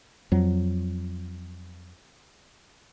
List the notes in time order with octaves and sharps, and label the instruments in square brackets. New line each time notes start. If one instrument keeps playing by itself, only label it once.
[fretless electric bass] F2 F#3